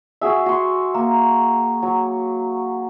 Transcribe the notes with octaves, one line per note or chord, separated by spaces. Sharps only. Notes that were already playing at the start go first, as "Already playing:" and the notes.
F#4 G#4 E5
F#4 C6
A#3
F#3